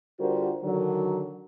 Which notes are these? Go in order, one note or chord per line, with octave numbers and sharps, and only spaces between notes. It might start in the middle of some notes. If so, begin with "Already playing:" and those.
D3 G3 F4 F#4 A#4 C5
D3 D#3 F#3